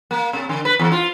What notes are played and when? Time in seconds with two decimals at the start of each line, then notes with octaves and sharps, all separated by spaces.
0.11 A#3
0.33 C3
0.49 D3
0.65 B4
0.79 E2
0.92 F4